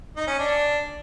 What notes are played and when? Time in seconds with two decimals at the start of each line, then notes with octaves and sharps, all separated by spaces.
0.16 D#4
0.28 C#4
0.39 D4